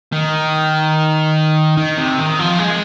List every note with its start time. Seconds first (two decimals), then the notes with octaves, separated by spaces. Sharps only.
0.13 D#3
1.78 D#3
1.98 C3
2.18 D#3
2.39 F3
2.59 G#3